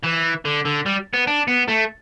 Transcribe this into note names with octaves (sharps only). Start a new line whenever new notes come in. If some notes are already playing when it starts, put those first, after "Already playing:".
E3
D3
D3
G3
B3
D4
B3
A3